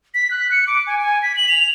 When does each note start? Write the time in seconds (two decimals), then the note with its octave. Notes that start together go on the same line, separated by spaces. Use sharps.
0.14 B6
0.31 F#6
0.52 C#7
0.67 D6
0.87 G#5
0.99 G#5
1.22 B6
1.37 F#7
1.48 F7